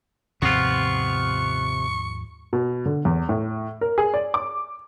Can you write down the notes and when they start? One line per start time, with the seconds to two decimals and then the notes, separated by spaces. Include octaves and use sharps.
0.42 D#2 G#2 C3 F3 B3 F4 C#6
2.53 B2
2.86 D3
3.05 E2
3.29 A2
3.81 A#4
3.98 G#4
4.14 D5
4.34 D6